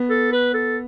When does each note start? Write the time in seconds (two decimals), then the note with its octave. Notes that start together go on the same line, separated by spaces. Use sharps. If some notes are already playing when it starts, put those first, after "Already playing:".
Already playing: B3
0.10 A4
0.32 B4
0.54 A4